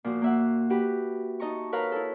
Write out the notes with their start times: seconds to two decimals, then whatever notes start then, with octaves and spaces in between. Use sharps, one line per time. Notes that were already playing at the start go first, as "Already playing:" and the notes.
0.04 A#2 F3 F#4
0.22 A#3 E5 F#5
0.70 F#4 G4 B4
1.40 D#4 D#5 A5 A#5 C#6
1.72 A#4 B4 C#5 F5 A#5 B5
1.92 E4 A4